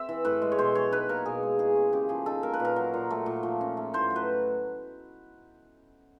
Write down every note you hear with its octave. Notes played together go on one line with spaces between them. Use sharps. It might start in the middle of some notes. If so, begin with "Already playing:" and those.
Already playing: C4 E5
E3
A2 B4
G#3
C#5
B2 C5
F#3 C#5
D#4 B4
A#3 A#4
B2 G#4
G#3
E4 G#4
C#4
C#3 G4
F3 G#4
D#4 A4
A#3 A#4
B4
A#2 A#4
F#3
A#2
A3
A#2
F3
C#4
A3
A2 C5
F#3
B4